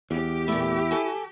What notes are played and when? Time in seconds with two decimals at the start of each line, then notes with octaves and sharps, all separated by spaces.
0.11 E2 G4
0.48 A#2 A3 E4
0.91 A4 G#5 A5